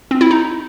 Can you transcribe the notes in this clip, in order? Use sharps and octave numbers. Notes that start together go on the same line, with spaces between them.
C4
E4
D#4